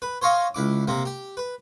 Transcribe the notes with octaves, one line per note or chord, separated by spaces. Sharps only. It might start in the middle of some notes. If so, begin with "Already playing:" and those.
B4
C5 C#5 D#5 F5 C#6
C#2 E4 D6
C3 A#3 C4
G4
B4